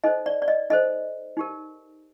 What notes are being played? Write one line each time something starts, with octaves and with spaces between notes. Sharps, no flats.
D#4 A4 C5 D#5
D5
D5
D#5
D#4 A4 C5 D#5
D#4 G4 A#4